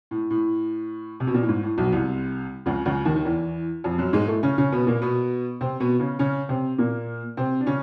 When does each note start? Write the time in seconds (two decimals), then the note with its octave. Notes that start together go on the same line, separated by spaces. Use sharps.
0.11 A2
0.30 A2
1.20 C3
1.27 B2
1.34 A#2
1.41 A2
1.49 G#2
1.63 A2
1.77 B1 B2
1.92 C2 C3
2.66 C#2 C#3
2.86 C#2 C#3
3.05 D#2 D#3
3.16 D#3
3.25 E2 E3
3.84 F2 F3
3.98 F#2 F#3
4.13 G#2 G#3
4.28 A2 A3
4.43 C#3 C#4
4.58 C#3 C#4
4.72 B2 B3
4.87 A#2 A#3
5.02 B2 B3
5.61 C3 C4
5.80 B2 B3
6.00 C#3 C#4
6.19 C#3 C#4
6.49 C3 C4
6.78 A#2 A#3
7.37 C3 C4
7.60 D4
7.67 C#3 C#4